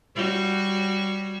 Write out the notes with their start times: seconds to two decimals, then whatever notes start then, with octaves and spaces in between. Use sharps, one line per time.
0.15 G3 F#4 C#5